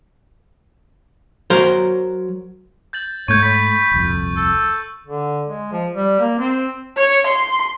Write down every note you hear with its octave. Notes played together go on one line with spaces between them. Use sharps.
F#3 A#4 C5
G6 A6 F#7
G#2 A3 C#5 C#6 G6
B5
D#1 C2 F2
A4
D3
G#3
F3
G3
A#3
C4
C#5
C6